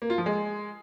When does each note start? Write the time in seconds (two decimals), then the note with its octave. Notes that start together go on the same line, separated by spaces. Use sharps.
0.02 A#3
0.10 F4
0.18 F3
0.26 G#3